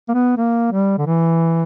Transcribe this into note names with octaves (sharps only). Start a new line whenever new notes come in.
A#3
B3
A#3
G3
D3
E3